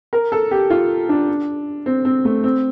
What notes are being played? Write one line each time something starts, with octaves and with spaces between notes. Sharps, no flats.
A#4
A4
G4
F4
D4
C4
C4
A3
C4